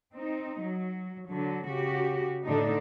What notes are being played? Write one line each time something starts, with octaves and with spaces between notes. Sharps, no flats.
C4 D#4
F#3
D3 F#3
C#3 F#4 G4
A2 D3 D4 D#4